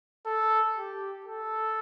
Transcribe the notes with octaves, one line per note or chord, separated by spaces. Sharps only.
A4
G4
A4